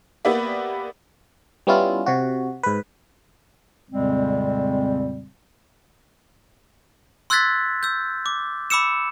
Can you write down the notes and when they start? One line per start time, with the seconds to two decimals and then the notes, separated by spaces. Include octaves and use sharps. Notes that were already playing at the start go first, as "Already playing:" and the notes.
0.25 A#3 B3 G4 B4 D5 E5
1.67 G3 B3 C#4 E4 F4
2.06 C3 F#4
2.63 G#2 B4
3.90 F2 A#2 C#3 G3 G#3 C4
7.30 C6 E6 F#6 G#6 A6 B6
7.83 E6 G6
8.26 D6
8.70 B5 D6 E6 C#7 E7